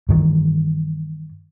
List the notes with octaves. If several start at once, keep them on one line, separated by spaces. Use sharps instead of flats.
G2 D#3 E3